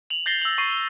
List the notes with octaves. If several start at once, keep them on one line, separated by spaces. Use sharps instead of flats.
F7 F#7
G6 A6 A#6 C7 G7
E6 F#7
C#6 C7 D#7
G7